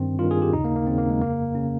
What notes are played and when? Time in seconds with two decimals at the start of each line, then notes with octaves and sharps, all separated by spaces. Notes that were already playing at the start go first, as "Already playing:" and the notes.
Already playing: G2 D#3 C4
0.19 G2 D#3 F4
0.31 G#4
0.42 G4
0.53 D#2 C#3 D#4
0.65 A#3
0.76 A#3
0.87 D#2 C#3 C4
0.98 A#3
1.10 G#3
1.21 F2 C#3 A#3
1.55 C#3 C#4